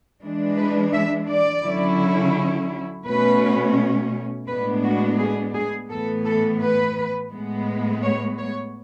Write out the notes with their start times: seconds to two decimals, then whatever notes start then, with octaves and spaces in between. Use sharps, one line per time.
0.22 E3 G#3 D4
0.57 B4
0.93 E5
1.28 D5
1.63 D3 F#3 C#4 E4
3.05 B2 A3 C#4 B4
4.47 A2 G#3 B3 D4 B4
4.83 F#4
5.18 G#4
5.54 G#4
5.89 A2 E3 B3 A4
6.25 A4
6.61 B4
7.31 A2 G#3 B3
8.03 C#5
8.38 C#5